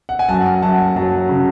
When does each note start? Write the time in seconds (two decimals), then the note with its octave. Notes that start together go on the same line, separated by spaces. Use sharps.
0.09 F#5
0.19 G#5
0.28 F#2 F#5 A5
0.63 F#2 F#5 A5
0.96 F#3 F#5 A5
1.29 C#3